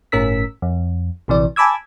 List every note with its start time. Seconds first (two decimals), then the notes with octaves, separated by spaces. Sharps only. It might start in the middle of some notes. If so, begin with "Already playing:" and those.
0.12 G1 A2 C#4 A#4 E6 B6
0.62 F2
1.28 A#1 C3 E3 D5
1.56 G#5 A5 B5 D6 E6 G#6